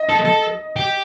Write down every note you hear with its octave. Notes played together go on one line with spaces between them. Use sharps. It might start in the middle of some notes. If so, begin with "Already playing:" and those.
Already playing: D#5
A4
A4
G4